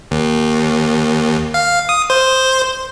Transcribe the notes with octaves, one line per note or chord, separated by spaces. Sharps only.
D#2
F5
D#6
C5